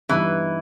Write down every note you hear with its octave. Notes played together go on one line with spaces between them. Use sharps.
G2 E3 G3 B3 D#4